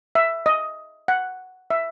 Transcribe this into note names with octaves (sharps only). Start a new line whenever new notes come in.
E5
D#5
F#5
E5